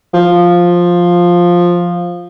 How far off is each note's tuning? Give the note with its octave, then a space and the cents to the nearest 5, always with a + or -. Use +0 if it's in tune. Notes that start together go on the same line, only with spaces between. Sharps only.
F3 +5